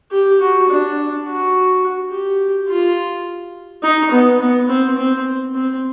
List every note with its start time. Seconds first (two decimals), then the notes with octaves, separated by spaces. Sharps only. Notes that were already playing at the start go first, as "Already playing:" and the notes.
0.11 G4
0.41 F#4
0.69 D4
1.26 F#4
2.11 G4
2.68 F4
3.83 D#4
4.11 B3
4.40 B3
4.69 C4
4.98 C4
5.55 C4